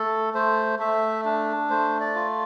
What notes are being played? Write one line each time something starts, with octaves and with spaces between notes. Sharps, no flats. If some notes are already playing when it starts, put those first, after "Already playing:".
Already playing: A3 A4
A3 C5
A3 E5
D4
A3 C5
D5
F4